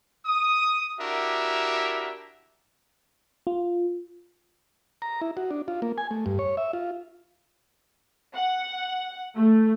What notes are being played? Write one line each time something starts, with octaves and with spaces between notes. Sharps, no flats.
D#6
D4 E4 F#4 G4 A#4 E5
F4
A#5
E4
F#4
D4
F4
A#3
G#5
A3
G2
C#5
E5
F4
F#5
A3